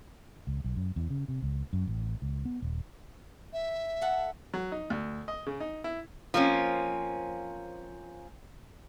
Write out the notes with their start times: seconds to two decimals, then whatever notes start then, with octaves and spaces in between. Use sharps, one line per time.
0.47 C#2
0.64 B1
0.76 F#2
0.96 E2
1.10 C#3
1.28 C3
1.42 C#2
1.73 F#2
1.87 A1
2.22 C#2
2.45 B3
2.62 D#1
3.53 E5
4.02 A4 F#5
4.54 F#3
4.72 D#4
4.90 D2
5.28 D#5
5.46 C#3
5.60 D#4
5.84 E4
6.34 F3 A#3 C4 C#4